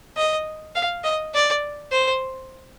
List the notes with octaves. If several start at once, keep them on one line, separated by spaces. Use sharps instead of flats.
D#5
F5
D#5
D5
C5